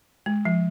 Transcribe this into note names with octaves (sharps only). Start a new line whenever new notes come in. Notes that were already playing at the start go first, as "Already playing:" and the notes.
G#3
F3